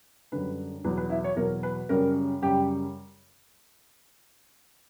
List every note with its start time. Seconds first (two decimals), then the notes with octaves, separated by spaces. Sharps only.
0.32 F#2 D3 G3 B4
0.84 E2 B2 F#3 B4
0.97 B4
1.10 E4
1.24 C#5
1.36 E2 B2 F#3 A#4
1.63 B4
1.89 F#2 C#3 G3 A#4
2.42 F#2 C#3 G3 G4